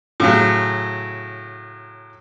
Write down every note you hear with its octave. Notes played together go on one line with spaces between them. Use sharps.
A2 C#3 F#3